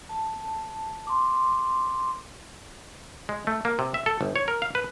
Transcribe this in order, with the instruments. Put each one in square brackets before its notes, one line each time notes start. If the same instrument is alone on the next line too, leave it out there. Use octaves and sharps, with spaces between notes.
[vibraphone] A5
C6 D6
[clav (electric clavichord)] G#3
A3
A#3
C3
E5
A4
G1
C#5
A#4
F5
B4